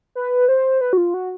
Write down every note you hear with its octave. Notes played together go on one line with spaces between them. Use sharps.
B4
C5
B4
F#4
F4
F#4